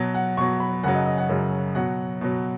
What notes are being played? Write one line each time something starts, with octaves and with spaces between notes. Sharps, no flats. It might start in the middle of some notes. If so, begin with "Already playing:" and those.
Already playing: B2 F#3
F#5
B2 F#3 C#6
B5
F#2 C#3 F#3 F#5
D#5
D#5
F#5
F#2 C#3 F#3
B2 F#3 F#5
B2 F#3